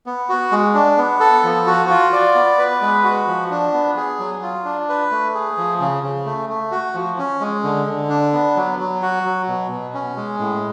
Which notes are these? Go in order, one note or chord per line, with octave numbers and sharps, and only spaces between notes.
B3
F#4
G#3
D4
B3
A4
F3
F#4
F4
D5
B3
B4
G#3
F#4
F3
D4
B3
G#4
F#3
F4
D4
B4
A3
G#4
F3
C#3
C#3
A3
A3
F#4
F3
C#4
G#3
D3
D3
D4
B3
F#3
F#3
F#4
F#3
B2
B2
C#4
G#3
A2